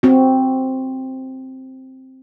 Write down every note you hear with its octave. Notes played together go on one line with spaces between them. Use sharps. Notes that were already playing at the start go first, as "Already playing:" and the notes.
C4 F#4